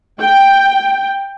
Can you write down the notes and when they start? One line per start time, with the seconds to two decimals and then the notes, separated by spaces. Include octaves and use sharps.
0.20 G5